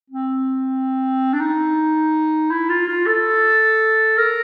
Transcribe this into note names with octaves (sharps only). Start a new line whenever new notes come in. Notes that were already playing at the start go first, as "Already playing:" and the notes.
C4
D4
D#4
E4
F4
F4
A4
A#4